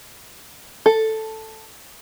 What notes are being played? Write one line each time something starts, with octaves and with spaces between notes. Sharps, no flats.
A4